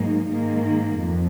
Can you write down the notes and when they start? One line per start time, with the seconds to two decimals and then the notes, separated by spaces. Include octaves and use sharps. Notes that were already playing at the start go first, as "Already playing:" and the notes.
Already playing: G#2 F#3 A#3 D#4
0.29 G#2 D#3 A#3
0.99 F2